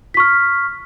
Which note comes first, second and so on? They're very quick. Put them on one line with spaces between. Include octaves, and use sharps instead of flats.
B6 C#6 F6